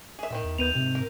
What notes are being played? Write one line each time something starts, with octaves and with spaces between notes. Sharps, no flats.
G#4 E5
A2 D#3 C4 E5
E2
D#2 B3 G6 D#7 F7
G#2 C3
A#4